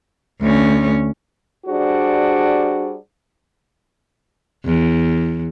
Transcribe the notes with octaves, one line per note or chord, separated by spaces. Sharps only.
D2 C#4
G3 D4 F#4 G#4 C5
E2